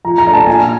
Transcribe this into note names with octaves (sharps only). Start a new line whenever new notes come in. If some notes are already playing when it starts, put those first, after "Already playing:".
F3 A#5
A#5
A3 D4
A5
A#2 G#5